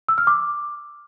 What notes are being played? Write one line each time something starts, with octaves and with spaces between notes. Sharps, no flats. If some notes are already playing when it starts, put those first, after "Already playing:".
E6
F6
D6